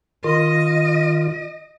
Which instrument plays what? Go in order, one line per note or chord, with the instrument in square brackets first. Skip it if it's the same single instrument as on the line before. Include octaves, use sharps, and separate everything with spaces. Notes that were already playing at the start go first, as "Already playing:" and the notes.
[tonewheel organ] D#3 F4 [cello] D#5